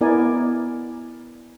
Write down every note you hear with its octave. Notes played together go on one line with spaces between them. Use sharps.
B3 E4 A#4 D5 D#5 G#5